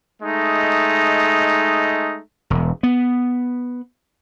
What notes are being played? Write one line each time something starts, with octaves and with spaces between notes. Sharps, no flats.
G#3 A3 D#4
E1
B3